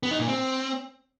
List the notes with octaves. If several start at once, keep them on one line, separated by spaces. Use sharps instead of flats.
B3
D#4
A#2
C4